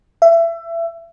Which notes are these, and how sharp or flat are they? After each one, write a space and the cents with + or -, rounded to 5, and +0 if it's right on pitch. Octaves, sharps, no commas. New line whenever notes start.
E5 +25